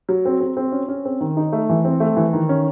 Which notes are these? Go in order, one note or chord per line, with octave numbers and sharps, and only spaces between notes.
F#3
C4
C4
C4
C#4
C#4
C4
D#3
D#4
A3
E3
C4
A3
E3
D#3
C#4